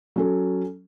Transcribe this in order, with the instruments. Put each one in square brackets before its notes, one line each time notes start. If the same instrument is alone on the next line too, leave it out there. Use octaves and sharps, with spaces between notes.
[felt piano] F#3 C#4 A4